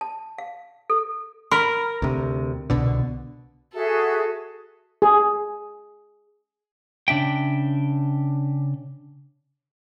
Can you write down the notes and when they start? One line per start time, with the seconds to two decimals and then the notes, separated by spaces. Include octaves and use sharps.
0.01 A5
0.38 F5
0.90 A4
1.51 A#4 B5 F6
2.02 D2 C3
2.70 C2 B2 D3
3.74 F#4 G#4 A4 E5
5.02 G#4
7.08 C#3 D4 E5 G5